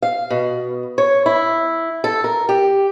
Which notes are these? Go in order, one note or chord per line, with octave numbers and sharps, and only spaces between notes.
F5
B2
C#5
E4
A4
A#4
G4